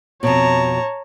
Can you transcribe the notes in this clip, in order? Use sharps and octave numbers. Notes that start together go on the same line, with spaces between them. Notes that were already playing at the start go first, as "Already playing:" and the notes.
F2 B2 C#5 A5 A#5